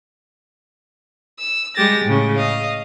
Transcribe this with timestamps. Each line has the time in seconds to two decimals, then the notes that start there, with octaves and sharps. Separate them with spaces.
1.40 E6
1.76 G3 G#3 G4 A6 A#6
2.05 A2 C#3
2.36 D#5 F5